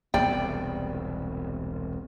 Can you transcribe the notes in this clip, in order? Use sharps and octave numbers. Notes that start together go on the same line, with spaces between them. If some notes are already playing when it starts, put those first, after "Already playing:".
E1 C2 B3 D5 G5